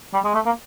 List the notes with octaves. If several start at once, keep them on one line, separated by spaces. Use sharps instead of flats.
G3
G#3
A3
A#3